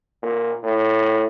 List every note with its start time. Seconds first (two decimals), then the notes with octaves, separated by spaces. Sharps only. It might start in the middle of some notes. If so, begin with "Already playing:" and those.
0.22 A#2
0.63 A2